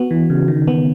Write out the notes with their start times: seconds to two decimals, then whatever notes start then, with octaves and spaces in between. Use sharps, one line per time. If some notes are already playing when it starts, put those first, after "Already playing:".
Already playing: B3 F#4
0.11 E3
0.30 C#3
0.48 D#3
0.68 B3